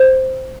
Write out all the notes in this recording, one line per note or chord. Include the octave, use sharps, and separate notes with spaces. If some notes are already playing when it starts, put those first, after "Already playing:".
Already playing: C5